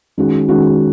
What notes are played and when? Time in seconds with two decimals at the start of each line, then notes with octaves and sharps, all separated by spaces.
0.18 D#3 G#3 C#4 F#4
0.49 D#3 G#3 C#4 F#4